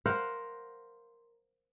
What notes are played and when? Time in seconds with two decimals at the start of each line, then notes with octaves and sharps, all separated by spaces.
0.06 A#4 C5 F5 F#5